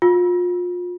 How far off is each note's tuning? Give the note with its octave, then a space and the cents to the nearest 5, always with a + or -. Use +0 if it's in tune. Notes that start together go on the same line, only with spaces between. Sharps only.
F4 +30